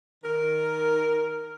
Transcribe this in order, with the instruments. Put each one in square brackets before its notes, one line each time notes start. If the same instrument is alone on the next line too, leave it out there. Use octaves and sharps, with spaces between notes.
[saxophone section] D#3 A#4